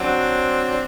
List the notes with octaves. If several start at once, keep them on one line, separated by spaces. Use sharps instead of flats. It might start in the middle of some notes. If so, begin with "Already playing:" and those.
Already playing: F#3 C4 D4
D4